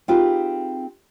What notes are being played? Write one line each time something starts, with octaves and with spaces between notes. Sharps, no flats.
C4 D#4 F4 G4 G#4 B4